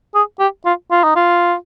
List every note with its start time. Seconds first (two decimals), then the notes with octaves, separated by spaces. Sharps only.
0.15 G#4
0.39 G4
0.65 F4
0.91 F4
1.03 D#4
1.16 F4